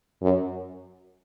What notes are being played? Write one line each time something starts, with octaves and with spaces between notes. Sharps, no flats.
F#2